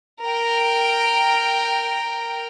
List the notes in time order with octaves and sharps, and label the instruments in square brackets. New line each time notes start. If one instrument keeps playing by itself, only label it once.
[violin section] A#4 G5